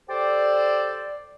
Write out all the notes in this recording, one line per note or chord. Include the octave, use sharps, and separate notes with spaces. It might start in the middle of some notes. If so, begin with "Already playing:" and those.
G4 A4 C5 D5